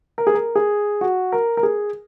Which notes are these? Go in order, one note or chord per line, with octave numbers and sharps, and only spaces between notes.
A#4
G#4
A#4
G#4
F#4
A#4
A#4
G#4